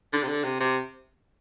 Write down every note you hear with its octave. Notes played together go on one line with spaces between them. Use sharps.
D3
C3
D3
C3
C3